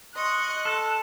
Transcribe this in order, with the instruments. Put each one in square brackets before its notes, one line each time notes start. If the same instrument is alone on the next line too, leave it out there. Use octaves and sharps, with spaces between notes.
[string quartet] D#5 C#6 [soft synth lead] C6 [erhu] F#6
[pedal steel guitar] A4 [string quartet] A5